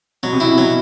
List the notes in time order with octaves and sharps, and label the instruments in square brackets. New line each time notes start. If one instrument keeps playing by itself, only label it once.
[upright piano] B2 [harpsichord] F#3
[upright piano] C3
[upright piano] B2 [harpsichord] E4
[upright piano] C3
[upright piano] B2 [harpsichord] F#3